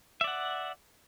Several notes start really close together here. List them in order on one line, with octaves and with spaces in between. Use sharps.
E5 D5 F#5